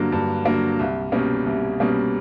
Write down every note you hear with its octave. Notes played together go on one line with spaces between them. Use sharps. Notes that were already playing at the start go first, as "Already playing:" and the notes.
Already playing: G2 D3 F#3 A#3
G2
D3 F#3 A#3
C2
B2 G3 A#3 C#4
C2
B2 G3 A#3 C#4